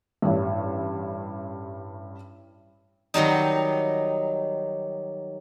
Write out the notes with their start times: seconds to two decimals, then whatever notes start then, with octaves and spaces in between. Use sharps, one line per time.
0.22 A1 G2
3.14 D#3 F#3 G3 D#4